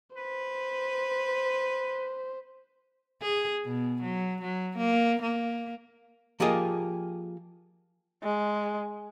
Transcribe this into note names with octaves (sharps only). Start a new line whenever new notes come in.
B4 C5
G#4
B2
F#3
F#3
A#3
A#3
F3 A#3 F4 G4 G#4 D#5
G#3